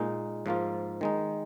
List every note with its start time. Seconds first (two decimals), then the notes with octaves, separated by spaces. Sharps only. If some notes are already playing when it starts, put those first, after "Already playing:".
Already playing: A#2 G#3 D#4
0.46 G#2 F3 A#3 F4
1.01 D#3 G#3 D#4